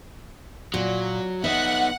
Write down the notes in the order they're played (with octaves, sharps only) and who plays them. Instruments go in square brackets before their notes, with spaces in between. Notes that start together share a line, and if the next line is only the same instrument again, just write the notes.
[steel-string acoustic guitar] A#2 [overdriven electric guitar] F#3
[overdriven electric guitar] B3 D#4 [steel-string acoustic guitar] E5 [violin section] F#5